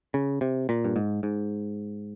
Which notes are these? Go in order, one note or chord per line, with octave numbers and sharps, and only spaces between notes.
C#3
C3
A#2
G2
G#2
G#2